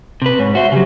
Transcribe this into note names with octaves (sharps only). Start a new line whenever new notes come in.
C3 B4
G#2 C#5
F#4 C5 E5
C#3 F#3 G4